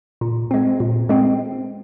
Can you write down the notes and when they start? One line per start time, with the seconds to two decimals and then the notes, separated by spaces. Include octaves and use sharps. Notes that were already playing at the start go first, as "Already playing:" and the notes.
0.21 A#2
0.51 G#3 C4
0.80 A#2
1.09 G#3 C4